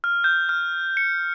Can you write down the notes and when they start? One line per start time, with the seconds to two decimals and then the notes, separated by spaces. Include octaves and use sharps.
0.04 F6
0.24 G6
0.49 F6
0.97 C#7